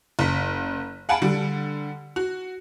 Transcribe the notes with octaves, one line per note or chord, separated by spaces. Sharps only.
F#1 B6
F5 F#5 G#5 A5 B5 D7
D3 G3
F#4